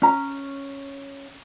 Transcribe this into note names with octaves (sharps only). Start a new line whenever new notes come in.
C#4 A#5